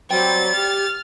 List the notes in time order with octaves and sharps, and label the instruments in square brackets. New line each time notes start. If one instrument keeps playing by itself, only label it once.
[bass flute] F#3 [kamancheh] C4 [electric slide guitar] D5 G5 [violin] A6
[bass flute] G4 [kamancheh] F6